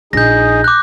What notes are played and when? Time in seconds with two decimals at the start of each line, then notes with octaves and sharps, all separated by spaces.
0.13 A#1 D#4 G#4 G6 A#6
0.64 D6 F#6